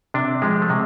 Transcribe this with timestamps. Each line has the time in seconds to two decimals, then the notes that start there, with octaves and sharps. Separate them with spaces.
0.14 C3 D4
0.42 F3 G#3
0.62 A3
0.70 C3 G#3